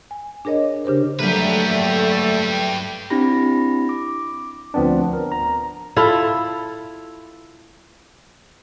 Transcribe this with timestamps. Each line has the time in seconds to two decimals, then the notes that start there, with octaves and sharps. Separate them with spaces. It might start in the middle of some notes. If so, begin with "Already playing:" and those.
0.11 G#5
0.45 D4 G#4 A#4 C#5 D#5
0.85 C#3 D4 G4 A#4 C5
1.19 D3 F#3 G3 A3 A#3 G4 B4
3.10 C4 D4 E4 G4 B5 A#6
3.89 D6
4.74 D2 F3 B3 C4 D4
5.13 A#4
5.32 A#5
5.97 E4 F4 A4